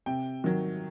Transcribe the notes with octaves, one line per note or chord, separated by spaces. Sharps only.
C3 G5
D#3 F#3